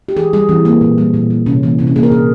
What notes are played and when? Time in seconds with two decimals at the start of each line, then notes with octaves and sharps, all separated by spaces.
0.09 G4
0.16 E3 G#4
0.33 G3 G#4
0.49 E3 C4
0.65 A#3
0.81 A#2
0.98 G3
1.14 A#2
1.30 A#3
1.46 C3 C#4
1.63 E3 A#3
1.79 C3 C4
1.87 C#4
1.96 A#3 G#4
2.03 A#4
2.11 A#2 G#4